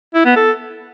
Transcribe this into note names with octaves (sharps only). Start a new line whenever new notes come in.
E4
B3
A4